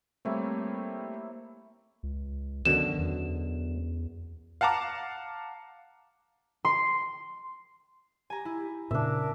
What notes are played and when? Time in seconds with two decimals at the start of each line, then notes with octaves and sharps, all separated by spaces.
0.25 G3 A3 A#3 C4 E4 C#5
2.03 C#2
2.65 F#2 B2 D3 D#3 E7
2.98 E2
4.61 F5 F#5 A5 A#5 D6
6.65 C6
8.30 G4 G#5 A#5
8.45 E4
8.91 A#2 C#3 D4 A#4 E5